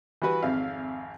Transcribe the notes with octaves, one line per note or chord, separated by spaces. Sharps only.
E3 G3 F#4 B4
G#1 F2 E5 F5